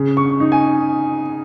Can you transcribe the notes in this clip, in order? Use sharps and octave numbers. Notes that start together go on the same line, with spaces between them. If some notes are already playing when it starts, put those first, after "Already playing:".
Already playing: C#3
C#6
D#4
G#5